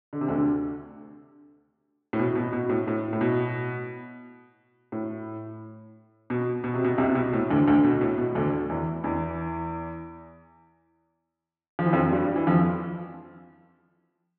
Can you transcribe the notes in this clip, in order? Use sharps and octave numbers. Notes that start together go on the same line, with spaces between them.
D3
C3
D2 D3
A2
B2
B2
B2
A2
A2
A2
B2
A2
B2
B2
C3
B2
C2 C3
B2
A2
D2 D3
D2 D3
B2
A2
B2
D2 D3
E2 E3
E2 E3
F3
E3
F2 F3
G2 G3
E3
F2 F3